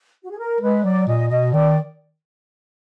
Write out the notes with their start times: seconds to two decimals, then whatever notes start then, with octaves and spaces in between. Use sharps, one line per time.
0.23 F#4
0.31 G#4
0.39 A#4
0.61 G#3 B4
0.84 F#3 D5
1.07 A#2 D#5
1.30 B2 D#5
1.53 D#3 D5